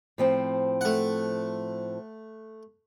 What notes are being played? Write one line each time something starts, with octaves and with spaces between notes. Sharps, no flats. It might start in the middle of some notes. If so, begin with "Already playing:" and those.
A2 F3 C4
A3 F#5